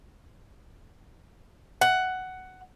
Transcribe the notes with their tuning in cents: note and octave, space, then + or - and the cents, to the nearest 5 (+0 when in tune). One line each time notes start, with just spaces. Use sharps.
F#5 +10